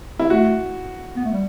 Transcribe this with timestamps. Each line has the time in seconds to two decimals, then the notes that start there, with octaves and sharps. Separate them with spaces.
0.19 E4
0.30 A3 F#4
1.17 B3
1.25 A3
1.33 G3